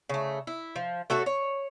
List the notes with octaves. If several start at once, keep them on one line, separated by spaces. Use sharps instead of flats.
C#3 A3
E4
F3
A3 F#4 A4 C#5
C#5